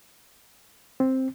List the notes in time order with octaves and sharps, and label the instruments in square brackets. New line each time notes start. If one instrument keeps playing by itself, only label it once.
[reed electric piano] C4